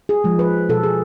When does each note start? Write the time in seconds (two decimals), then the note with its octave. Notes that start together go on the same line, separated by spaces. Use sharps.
0.09 G#4
0.24 F3 G#3
0.39 B4
0.69 B2 A4
0.83 G#4